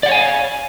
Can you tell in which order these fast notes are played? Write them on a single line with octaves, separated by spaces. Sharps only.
D5 F#5 C#5 G#5 F5